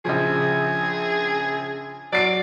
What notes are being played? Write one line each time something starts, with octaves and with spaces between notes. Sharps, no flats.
A#1 C#3 F3 G#4
F#3 D5 C7 D7